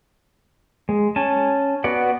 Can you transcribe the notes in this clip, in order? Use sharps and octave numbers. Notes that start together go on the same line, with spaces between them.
G#3
C#4 G#5 A5
B3 F#4 D5 F#5